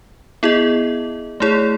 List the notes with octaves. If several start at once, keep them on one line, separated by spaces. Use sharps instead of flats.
B3 E4 G#4 D#5
A3 E4 G#4 C#5